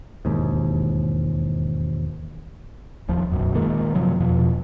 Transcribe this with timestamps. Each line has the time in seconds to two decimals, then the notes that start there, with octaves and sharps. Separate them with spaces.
0.25 E1 D#2 G#2
3.08 F1 D#2 F3
3.32 D1 B1 F#2
3.54 A#2 D#3 G#3 A#3
3.95 F#2 C3 F3 F#3
4.20 E2 B2 F3